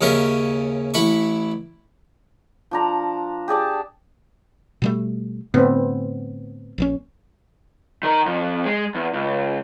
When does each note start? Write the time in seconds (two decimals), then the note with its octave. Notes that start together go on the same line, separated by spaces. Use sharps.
0.01 D#2 C#3 C#4 A#4 E5
0.94 A1 E4 B5 C#6
2.71 F3 D4 A#5
3.48 G4 G#4 D5 A5
4.82 B2 G3 A3
5.54 A2 D3 B3 C4
6.78 A#1 E3 C#4
8.03 D#3 A#4
8.26 F2
8.65 G#3
8.95 E2
9.13 C#2